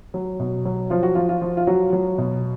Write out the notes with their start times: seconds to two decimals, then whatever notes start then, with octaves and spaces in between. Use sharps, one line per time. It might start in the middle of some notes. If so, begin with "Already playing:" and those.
0.14 F#3
0.39 B2
0.65 F#3
0.90 F3 F4
1.03 F#4
1.15 F3 F4
1.29 F4
1.42 F3
1.57 F4
1.67 F#3 F#4
1.93 F#3
2.18 B2